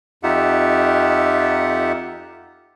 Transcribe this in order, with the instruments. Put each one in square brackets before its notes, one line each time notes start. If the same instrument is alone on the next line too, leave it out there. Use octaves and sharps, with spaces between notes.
[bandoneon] F2 D#4 F4 G4 E5 F#5